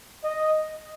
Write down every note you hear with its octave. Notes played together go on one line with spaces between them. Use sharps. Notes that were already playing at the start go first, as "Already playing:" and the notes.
D#5